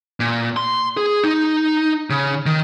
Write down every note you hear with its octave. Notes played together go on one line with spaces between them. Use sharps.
A#2
C6
G#4
D#4
C#3
D#3